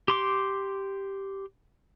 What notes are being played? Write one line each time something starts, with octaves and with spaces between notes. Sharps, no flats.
G4 C6 D6